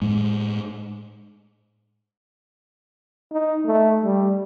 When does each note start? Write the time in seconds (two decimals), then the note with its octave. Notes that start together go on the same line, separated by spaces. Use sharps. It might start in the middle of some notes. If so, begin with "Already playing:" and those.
0.02 A2 G#3
3.31 D#4
3.67 A3
4.04 G3